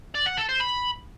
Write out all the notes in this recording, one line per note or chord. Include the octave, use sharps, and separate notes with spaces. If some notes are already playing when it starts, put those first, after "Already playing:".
D5
F#5
A4
C5
B5